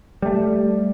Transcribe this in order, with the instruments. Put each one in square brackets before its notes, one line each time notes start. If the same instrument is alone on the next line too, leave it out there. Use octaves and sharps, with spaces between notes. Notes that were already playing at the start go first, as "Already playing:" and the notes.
[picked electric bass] G3 A3